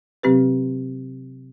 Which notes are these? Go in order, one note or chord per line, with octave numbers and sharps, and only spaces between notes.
C3 F#3 C4 G4 B4